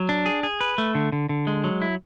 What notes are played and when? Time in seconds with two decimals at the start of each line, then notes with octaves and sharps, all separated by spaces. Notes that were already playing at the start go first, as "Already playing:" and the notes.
Already playing: F#3
0.09 D4
0.26 G#4
0.43 G#4
0.61 B4
0.78 A3
0.95 D3
1.12 D3
1.29 D3
1.47 G#3
1.64 F#3
1.82 E4